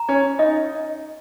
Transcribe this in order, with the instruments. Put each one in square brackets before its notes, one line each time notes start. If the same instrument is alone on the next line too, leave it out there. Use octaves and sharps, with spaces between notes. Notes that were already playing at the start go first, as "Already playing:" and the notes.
Already playing: [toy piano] A#5
[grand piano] C#4
[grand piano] D#4 [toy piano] D#5